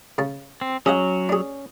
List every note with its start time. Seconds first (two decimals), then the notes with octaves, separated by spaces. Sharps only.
0.18 C#3 A5
0.61 C4
0.86 F#3 C#4 G#4 D#5 F#5
1.29 D4 G#4